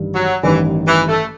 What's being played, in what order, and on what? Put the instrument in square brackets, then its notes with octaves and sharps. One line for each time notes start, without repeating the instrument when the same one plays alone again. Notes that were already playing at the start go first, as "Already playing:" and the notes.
Already playing: [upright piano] A1 G2 D#3
[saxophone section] F#3
[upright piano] A1 G2 D#3 [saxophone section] E3
[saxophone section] E3
A3